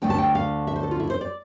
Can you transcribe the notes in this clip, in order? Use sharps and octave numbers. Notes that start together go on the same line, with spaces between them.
D2 D3 A3 G5
A5
G5
F5
E5
C5
A4
F4
E4
C5
D5